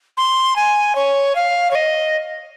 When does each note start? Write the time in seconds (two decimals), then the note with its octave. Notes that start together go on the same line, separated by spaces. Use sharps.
0.17 C6
0.56 G#5
0.95 C#5
1.35 F5
1.71 C#5
1.75 D#5